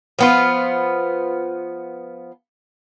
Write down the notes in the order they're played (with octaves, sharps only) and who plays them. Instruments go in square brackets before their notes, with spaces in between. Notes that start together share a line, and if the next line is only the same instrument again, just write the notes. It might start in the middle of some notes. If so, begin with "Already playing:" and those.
[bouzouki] F3 B3 F4